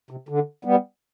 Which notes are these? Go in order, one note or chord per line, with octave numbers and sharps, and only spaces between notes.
C3
D3
G3 B3